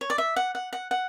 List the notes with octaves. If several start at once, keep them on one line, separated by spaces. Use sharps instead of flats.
C#5
D5
E5
F#5
F#5
F#5
F#5